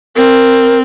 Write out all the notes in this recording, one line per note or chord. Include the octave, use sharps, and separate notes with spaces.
C4 A#4